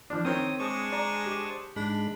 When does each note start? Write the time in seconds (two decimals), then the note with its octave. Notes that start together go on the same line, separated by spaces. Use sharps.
0.10 F3 D4
0.25 D#3 C4 C#5 G5 D#6
0.60 G#3 D4 C5 G#5 A5 C#6 D#6
0.92 D5 A#5
1.26 G4
1.76 G#2 G#3 D4 B5